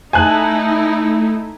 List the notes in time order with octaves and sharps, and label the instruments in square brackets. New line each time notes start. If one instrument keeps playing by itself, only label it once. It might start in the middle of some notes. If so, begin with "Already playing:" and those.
[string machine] A3 [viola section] D#4 E4 [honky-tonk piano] G#5 A5 F#6